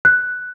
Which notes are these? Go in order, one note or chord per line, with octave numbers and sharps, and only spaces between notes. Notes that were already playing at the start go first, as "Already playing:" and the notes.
F#6